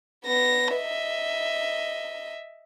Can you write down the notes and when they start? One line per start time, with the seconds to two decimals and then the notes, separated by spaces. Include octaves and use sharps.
0.25 B3 A#6
0.74 D#5 E5